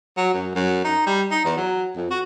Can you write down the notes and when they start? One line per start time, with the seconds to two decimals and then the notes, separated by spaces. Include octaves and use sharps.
0.17 F#3
0.34 F#2
0.55 F#2
0.84 D#4
1.06 G3
1.31 D#4
1.45 E2
1.57 F#3
1.96 F2
2.11 F#4